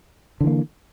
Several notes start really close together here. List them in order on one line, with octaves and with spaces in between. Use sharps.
D3 E3 A#3